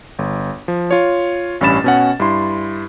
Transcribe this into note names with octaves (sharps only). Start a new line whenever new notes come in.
G1
F3
F4 C#5
A1 G2 C#4 B5 A6 E7
B2 C#4 F#5
G2 E4 C6